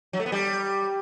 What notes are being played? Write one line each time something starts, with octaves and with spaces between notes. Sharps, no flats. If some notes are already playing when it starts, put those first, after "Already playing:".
F#3
A3
B3
G3